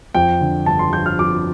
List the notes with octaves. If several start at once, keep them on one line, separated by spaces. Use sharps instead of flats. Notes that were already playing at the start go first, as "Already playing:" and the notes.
F2 G5
D3
G1 A5
C6
F3 G6
F6
F2 D6